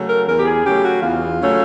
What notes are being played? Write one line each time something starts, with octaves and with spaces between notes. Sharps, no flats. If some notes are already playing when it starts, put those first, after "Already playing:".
Already playing: C#3 F#3 A3 C#4
A#4
E2 A#4
G4
G#4
C#3 F#3 A3 C#4 G4
F#4
E2 F4
C#3 F#3 A3 C#4